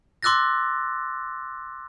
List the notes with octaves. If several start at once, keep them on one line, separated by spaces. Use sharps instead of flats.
C6 D6 E6 F#6 A6 A#6